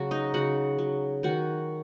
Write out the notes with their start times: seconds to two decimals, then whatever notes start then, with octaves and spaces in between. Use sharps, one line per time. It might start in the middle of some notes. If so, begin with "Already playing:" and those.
Already playing: C#3 F#3 F#4
0.11 D#4 D#5
0.34 C#3 F#4 F#5
0.78 F#3
1.23 D#3 F#4 F#5